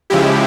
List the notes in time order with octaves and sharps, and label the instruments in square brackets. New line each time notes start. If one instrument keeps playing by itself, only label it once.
[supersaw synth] C#3 F3 G#3 E4 G4